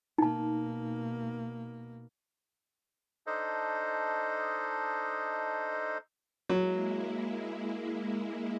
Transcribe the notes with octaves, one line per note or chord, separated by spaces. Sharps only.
B2 A#3 D#4 A5
D4 D#4 A4 C5 D#5
F#3 G#3 A#3 E4